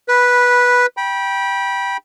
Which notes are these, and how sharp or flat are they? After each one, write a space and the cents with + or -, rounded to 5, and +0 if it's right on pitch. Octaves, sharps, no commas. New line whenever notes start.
B4 -10 B5 +0
G5 +0 B5 -25